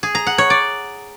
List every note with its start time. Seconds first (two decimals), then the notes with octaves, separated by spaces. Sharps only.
0.03 G#4
0.15 A#5
0.27 F#5
0.38 C#5
0.50 D5